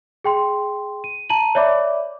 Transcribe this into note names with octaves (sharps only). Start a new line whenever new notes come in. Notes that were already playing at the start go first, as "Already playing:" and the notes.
G#4 G5 C6
D#7
A5 A#5 D#7 F#7
C#5 D5 E5 B5 D6